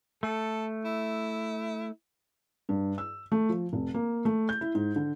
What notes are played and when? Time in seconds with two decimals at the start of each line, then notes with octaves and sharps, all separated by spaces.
0.23 A3 A4
0.84 E4
2.69 G2
2.98 E6
3.32 A3
3.49 F3
3.73 F1
3.94 A#3
4.25 A3
4.49 G6
4.61 E4
4.75 G#2
4.96 D3